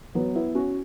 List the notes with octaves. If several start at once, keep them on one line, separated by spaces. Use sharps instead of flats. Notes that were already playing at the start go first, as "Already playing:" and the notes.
F#3 B3
B3 E4
C#4 F#4